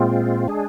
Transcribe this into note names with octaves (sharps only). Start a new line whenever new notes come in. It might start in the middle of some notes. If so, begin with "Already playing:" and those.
Already playing: A#2 G#3 C4 F4
G#3 D4 G#4